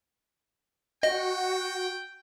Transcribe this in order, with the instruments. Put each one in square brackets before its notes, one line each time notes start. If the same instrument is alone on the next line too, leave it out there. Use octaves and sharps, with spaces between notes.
[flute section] F#4 [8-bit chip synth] D#5 [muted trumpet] G5